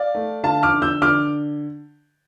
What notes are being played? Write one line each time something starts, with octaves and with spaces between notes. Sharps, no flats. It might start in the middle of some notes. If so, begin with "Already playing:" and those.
Already playing: D5 F5
A3
D3 F5 A5
D6 F6
D3
E6 G6
D3 D6 F6